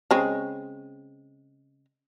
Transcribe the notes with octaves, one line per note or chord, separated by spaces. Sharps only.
C#3 G#3 C4